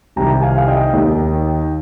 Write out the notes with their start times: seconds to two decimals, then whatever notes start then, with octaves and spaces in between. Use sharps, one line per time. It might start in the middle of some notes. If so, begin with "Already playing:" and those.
0.16 C2 C3 D#3 G5 A#5
0.42 F5 G#5
0.58 F5
0.68 D#5 G5
0.93 D#2 D#3